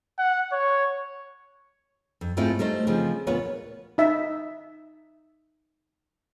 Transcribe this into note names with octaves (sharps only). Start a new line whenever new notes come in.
F#5
C#5
F2
G#2 A3 C4 E4 F4
G3 A3 D#4 C5
C#3 F3 C4
D2 A#2 B3 F4 B4 C#5
D#4 E5